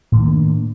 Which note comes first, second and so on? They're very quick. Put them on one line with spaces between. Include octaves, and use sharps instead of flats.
A2 D#3 A#3 D4